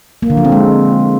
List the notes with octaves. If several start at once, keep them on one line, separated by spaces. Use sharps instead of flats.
A#3
D3
F3
C4
G#3